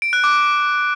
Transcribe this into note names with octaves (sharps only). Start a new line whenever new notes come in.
D7
F#6
D6